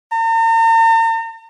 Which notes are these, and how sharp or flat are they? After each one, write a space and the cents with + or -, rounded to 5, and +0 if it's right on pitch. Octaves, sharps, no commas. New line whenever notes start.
A#5 -45